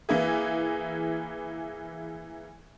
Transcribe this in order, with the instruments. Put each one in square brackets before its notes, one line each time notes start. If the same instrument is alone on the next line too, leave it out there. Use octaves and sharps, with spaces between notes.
[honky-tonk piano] E3 A#3 E4 G#4